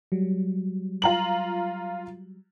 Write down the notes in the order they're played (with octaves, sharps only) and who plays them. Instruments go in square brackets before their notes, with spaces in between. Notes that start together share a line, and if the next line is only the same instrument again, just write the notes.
[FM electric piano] F#3 G3
[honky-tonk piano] F4 A#5 F#7